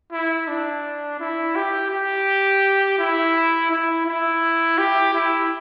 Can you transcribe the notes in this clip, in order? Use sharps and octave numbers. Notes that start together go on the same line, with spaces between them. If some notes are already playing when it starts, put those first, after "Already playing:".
E4
D4
E4
G4
G4
E4
E4
E4
G4
E4